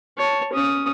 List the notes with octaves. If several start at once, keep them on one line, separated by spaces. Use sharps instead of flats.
C#5 A5
C#4 D#6